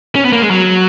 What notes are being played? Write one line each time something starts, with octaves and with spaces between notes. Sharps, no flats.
C#4
B3
A#3
G#3
F#3